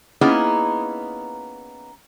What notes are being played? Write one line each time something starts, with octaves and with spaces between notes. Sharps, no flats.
A#3 B3 C#4 D#4 E4 G#4